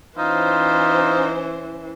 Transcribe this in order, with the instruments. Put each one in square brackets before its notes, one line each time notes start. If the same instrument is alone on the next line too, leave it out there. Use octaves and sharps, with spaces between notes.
[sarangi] E3 [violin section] C#4 C5 [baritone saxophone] D#4 [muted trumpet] F4